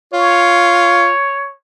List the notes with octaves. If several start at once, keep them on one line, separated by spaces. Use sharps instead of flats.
F4 C#5